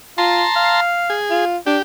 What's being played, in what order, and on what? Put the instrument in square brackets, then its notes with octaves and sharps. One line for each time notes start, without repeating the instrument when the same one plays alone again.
[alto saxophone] F4 [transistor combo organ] A5 A#5 C6
[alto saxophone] F5
[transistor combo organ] G#4
[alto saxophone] F4
[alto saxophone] D4 [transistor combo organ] G4